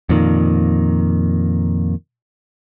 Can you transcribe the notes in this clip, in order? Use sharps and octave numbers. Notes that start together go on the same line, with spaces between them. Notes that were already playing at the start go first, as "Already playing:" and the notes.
F2 A#2 D#3